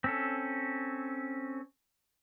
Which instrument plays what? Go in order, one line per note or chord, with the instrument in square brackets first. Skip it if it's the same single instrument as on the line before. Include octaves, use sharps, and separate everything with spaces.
[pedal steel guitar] C4 C#4 A4